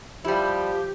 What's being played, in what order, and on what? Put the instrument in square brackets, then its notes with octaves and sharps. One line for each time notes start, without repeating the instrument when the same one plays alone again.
[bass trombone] F3 [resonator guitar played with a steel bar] G3 E4 [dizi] G4